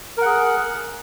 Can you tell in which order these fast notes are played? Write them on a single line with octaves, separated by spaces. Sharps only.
A#4 F#5 G#4